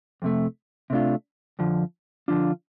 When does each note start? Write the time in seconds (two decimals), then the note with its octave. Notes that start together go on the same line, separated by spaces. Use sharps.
0.22 F2 C3 A3
0.90 C3 A3 D4 F4
1.59 F2 D3 F3
2.28 D3 F3 D4 F4